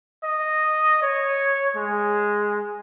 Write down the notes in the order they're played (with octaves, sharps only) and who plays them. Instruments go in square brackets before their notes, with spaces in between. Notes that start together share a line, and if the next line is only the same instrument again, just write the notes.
[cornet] D#5
C#5
G#3